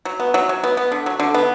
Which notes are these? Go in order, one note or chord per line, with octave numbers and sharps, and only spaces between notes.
F#3
B3
F#3
F#3
B3
B3
D3
F#3
D3
B3